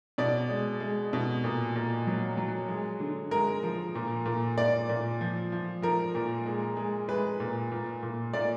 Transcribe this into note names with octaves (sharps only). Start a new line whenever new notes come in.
B2 D5
G#3
G#3
B2
A#2
A#2
F#3
F#3
G#3
D3
G#3 A#4
F3
A#2
A#2
A#2 D5
A#2
F3
F3
F3 A#4
A#2
G#3
G#3
G#3 B4
A#2
A#2
A#2
A#2 D5